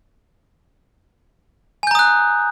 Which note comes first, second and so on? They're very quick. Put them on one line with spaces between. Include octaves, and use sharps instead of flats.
G#5 G6 A#5 D#6 F#6